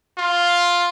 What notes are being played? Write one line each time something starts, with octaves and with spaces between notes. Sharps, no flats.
F4